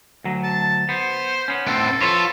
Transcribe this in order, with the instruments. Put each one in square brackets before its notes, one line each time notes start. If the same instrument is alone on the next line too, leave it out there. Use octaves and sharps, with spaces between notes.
[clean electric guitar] D2 F#3
[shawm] A5
[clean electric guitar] B3 [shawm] C5
[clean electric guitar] B3 C#4
[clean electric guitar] A2 [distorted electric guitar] B3 C4 [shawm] A4
[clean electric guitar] F3 B4 C#5 [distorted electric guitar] F4 [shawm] A4